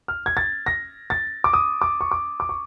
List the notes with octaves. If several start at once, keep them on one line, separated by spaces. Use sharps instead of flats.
F6
G#6
A6
A#6
A6
D6
D#6
D6
C#6
D6
D6
C#6